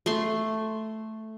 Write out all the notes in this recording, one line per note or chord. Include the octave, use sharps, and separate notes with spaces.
A3 C6